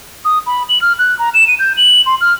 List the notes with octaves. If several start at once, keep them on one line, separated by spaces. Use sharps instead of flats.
D#6
B5
F#7
F6
F#6
A#5
E7
D#7
G6
F#7
C6
F6